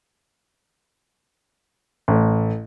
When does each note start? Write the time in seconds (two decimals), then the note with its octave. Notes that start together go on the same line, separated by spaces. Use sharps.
2.08 A1